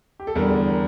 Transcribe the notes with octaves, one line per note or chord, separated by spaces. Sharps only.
G4
A4
E2 D3 G3 A#4
A#4